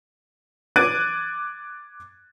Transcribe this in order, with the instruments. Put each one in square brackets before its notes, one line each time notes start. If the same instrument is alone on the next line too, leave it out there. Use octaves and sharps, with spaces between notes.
[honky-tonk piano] D6 F#6 G#6 A6 D7 D#7